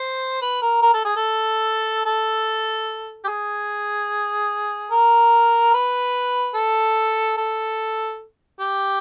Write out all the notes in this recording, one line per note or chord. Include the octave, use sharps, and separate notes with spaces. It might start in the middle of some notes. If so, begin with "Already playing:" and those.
Already playing: C5
B4
A#4
A#4
A4
G#4
A4
A4
G4
G#4
A#4
B4
A4
A4
G4